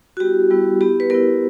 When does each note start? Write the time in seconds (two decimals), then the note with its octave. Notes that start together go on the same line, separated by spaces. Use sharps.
0.17 F#4
0.20 G3 B3 E4 G4
0.50 G3 B3 E4
0.81 B3 E4 G4
1.00 B4
1.10 B3 E4 A#4